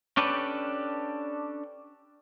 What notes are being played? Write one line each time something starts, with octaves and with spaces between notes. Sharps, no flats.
C#4 D4 G4 A4 B4